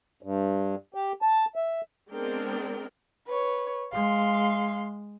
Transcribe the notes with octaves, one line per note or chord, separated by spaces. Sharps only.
G2
G4
A5
E5
G#3 B3 C4 D4 A#4 G5
B4 C#5
G#3 F5 C6